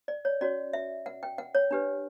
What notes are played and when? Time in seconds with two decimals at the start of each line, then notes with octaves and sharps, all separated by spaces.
0.08 D5
0.25 C#5
0.41 C#4 F#4 C#5 D5
0.73 E5
1.06 F#5
1.23 G5
1.38 F#5
1.55 C#5
1.71 D4 G4 B4